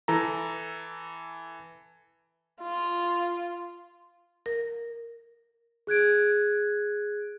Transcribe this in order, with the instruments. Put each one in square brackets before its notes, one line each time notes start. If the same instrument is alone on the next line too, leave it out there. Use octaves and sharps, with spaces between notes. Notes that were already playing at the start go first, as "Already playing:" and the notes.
[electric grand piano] E3 A4 A#5
[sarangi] F4
[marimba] A#4
[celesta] G#4 F#6 G#6 D7